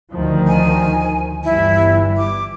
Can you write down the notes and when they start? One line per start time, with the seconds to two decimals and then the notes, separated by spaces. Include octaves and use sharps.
0.11 D2 D#3 F3
0.48 G#5
1.44 G1 E3 G3 E4
2.17 D6